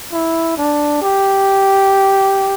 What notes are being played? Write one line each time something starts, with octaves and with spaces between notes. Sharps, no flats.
E4
D4
G4